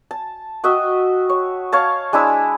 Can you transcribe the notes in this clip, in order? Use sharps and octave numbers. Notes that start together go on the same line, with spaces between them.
A5
F#4 D#5 E5 G5
C#5
C#5 F5 A5
G#3 D4 E4 E6